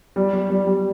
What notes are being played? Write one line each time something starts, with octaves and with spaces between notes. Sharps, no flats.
G3
G3
G3
G3